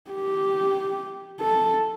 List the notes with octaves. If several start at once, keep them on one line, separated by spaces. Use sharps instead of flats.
G4
A4